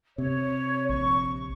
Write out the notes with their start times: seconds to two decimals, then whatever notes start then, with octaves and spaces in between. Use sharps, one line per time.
0.18 C3 C#5
0.89 A#1 C#6